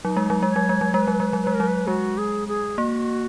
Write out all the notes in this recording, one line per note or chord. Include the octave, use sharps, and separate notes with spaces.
F#3 D#4
G#3
F#3
G#3
C#5
F#3
G#3
F#3
G#3 B4
F#3
G#3
F#3
B4
G#3
A#4
F#3
B4
G#3 F#4
G#4
G#4
A#3 F#4